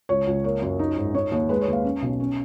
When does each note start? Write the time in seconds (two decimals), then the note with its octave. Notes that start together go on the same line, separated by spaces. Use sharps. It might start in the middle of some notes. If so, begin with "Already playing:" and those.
0.09 C#2 C#5
0.27 C#2
0.44 A#3 C#5
0.62 F#2
0.79 D#4
0.97 G#2
1.15 D#4 C#5
1.32 D#2 C#5
1.49 G#3 B4
1.61 C#5
1.68 D#2
1.73 F5
1.84 C#4
2.02 B1
2.20 C#4